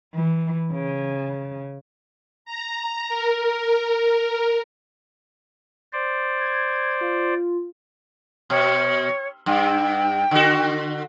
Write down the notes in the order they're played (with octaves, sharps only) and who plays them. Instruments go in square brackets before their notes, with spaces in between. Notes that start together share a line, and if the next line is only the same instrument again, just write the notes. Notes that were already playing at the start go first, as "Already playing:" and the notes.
[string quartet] E3
C#3
[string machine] A#5
A#4
[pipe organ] C5 D5
[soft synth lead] G#6
F4
[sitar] B2 [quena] C#5
[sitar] G2 [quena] G5
[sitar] D3 F#4